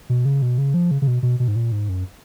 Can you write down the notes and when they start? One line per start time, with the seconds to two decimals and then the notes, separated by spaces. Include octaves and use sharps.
0.09 B2
0.25 C#3
0.42 B2
0.58 C#3
0.74 F3
0.91 C#3
1.02 C#3
1.07 B2
1.23 B2
1.40 B2
1.48 G#2
1.56 A#2
1.72 G#2
1.89 F#2